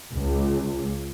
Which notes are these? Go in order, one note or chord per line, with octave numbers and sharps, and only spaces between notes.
C#2